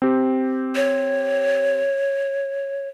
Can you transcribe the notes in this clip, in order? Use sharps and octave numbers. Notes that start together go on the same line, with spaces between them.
C4 G4
C#5